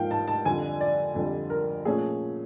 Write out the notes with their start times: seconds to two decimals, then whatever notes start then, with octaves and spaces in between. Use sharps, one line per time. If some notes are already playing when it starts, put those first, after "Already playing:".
Already playing: G#2 F3 A#3 F5 G5
0.11 A5
0.27 A5
0.45 F2 D3 G3 G#5
0.80 D5
1.15 F2 D3 G3
1.50 A#4
1.85 A#2 F3 A3 C#4 G#4